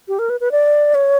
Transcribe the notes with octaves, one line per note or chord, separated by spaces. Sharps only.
G4
A#4
B4
B4
D5
C#5